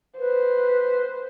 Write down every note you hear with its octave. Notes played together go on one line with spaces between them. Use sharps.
B4 C5